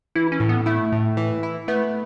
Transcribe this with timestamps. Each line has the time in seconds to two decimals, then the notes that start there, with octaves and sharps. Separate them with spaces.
0.15 E3 E4
0.32 C#4
0.40 A2
0.49 B3
0.66 A3 E4
0.92 A2
1.17 E3
1.43 E4
1.68 A3 B3